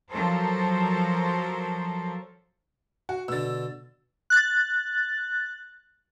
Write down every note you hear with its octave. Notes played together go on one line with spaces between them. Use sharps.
F3 F#3 A4 A#4 C5
F#4
B2 D3 E6 A6
F#6 A6